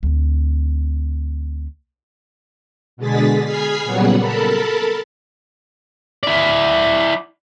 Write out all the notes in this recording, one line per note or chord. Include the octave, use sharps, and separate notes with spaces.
D2 C4
B2 D3 G#3 G#4 A6 B6
G#4 B5 F6 G#6 B6 C7
A#2 C#3 F#3 G3 B3 F#5
A4 A#4 A5 B5
E4 D5